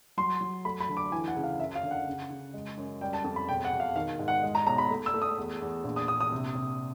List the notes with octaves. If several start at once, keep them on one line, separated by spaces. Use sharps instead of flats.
F#3 C6
F#3
A3 B5
B5
D2
D6
E3 G#5
F#5
C#2
F5
F#2 E5
F5
D3
F#5
C#3
C#3
G#3
F#2
G3 G5
A5
F2
B5
E1 G5
F#5
E1
F5
D#3 F5
G#2
F#5
G#3
A#5
B1 A#5
B5
A3
E6
A3
D#6
E2
E2
A#1
D#6
A#1 D#6
D#6
C3
C3